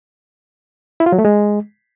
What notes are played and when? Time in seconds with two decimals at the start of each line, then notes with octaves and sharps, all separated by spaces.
1.00 E4
1.06 F4
1.12 F#3
1.19 A3
1.25 G#3